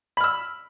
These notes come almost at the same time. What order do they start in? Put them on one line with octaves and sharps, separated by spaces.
B5 F6 E6